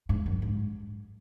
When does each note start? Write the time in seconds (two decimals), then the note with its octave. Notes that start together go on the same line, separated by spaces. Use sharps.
0.09 G#2
0.26 F#2
0.42 G#2